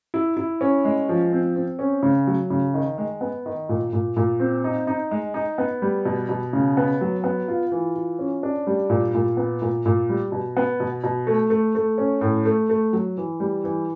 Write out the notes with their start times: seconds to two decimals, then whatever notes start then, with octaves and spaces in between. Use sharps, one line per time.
0.14 E4
0.37 E4
0.61 C#4
0.85 G#3
1.09 F3
1.32 C4
1.56 C4
1.79 C#4
2.03 C#3
2.27 F#3
2.50 C#3
2.74 D#3
2.98 G#3
3.21 B3
3.46 D#3
3.69 A#2
3.93 A#2
4.17 A#2
4.40 C4
4.64 D#4
4.87 D#4
5.11 G#3
5.34 D#4
5.58 B3
5.82 G3
6.05 B2
6.29 B2
6.53 C#3
6.77 B3
7.01 F#3
7.24 B3
7.48 F4
7.72 E3
7.96 F4
8.19 C#4
8.43 D4
8.67 G3
8.90 A#2
9.14 A#2
9.37 B3
9.62 A#2
9.86 A#2
10.09 G3
10.32 B2
10.57 B3
10.80 B2
11.04 B2
11.27 A3
11.50 A3
11.75 A3
11.98 C#4
12.21 A2
12.45 A3
12.69 A3
12.93 F#3
13.17 E3
13.40 G3
13.64 E3